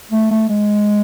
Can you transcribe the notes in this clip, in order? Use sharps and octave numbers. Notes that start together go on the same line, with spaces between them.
A3
A3
G#3